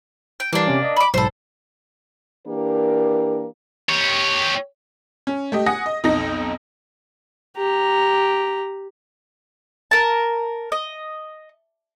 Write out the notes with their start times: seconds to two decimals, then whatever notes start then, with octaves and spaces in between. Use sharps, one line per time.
0.40 G5
0.53 E3 G3 A#3 D4 C7
0.67 C3 C#4
0.83 D5 D#5
0.97 B5 D6
1.14 B1 G#2 A4 C5 B5
2.46 E3 A#3 D4 G4 A#4
3.89 G4 C#5
5.27 C#4
5.52 A3 G4 D#5
5.66 F#5 G#5 D#6 A#6
5.86 D#5
6.04 B1 F2 D#4 A#6
7.57 G4 A#5
9.91 A#4 A5
10.72 D#5